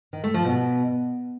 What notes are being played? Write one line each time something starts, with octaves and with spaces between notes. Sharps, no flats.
D#3
A3
F3
B2